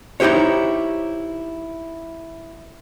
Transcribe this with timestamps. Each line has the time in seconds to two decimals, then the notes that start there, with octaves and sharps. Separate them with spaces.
0.20 D#4 E4 G4 C5 C#5